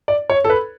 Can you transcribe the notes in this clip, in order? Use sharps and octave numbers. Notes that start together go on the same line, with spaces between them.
D5
C#5
A4
B4